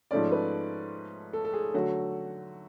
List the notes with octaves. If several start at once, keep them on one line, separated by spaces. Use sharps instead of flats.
G#2 F3 A3 C#4 D5
B4
A4
A4
G#4
D3 F#3 A3 F#4